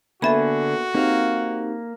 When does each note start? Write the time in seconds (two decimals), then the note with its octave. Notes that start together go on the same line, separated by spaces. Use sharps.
0.22 D3 A#3 B3 F#4 A4 E5 G#5 B5
0.94 A#3 C4 D#4 G4 F5